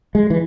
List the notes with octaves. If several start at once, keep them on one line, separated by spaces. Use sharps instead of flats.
G#3
E3